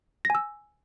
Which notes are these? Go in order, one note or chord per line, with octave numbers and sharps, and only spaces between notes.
G#5 E6 A#6